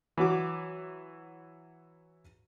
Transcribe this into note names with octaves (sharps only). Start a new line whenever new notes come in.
E3 F#3 F#4 D6